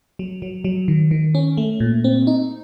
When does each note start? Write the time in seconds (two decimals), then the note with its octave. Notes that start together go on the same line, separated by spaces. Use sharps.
0.19 F#3
0.42 F#3
0.64 F#3
0.88 D#3
1.11 D#3
1.35 C#4
1.57 A3
1.80 A#2
2.04 C4
2.27 D#4